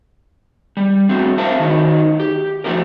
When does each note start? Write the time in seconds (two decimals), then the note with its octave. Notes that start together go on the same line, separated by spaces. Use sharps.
0.77 G3
1.09 F#3 A3 C4
1.38 A#4 C5 E5 A5
1.60 D#3 F#3 D#4
2.20 G4
2.64 F3 F#3 A3 A#3 G4 A#4